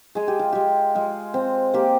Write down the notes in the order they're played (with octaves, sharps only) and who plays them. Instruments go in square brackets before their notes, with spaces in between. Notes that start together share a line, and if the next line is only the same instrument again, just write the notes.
[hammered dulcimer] G#3 G#4
G4
F4
G#3 G4
G#3 F4
C4
A#3 G4